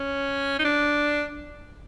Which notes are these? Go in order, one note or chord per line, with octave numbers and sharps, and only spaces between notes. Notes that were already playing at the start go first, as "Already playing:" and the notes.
Already playing: C#4
D#4
D4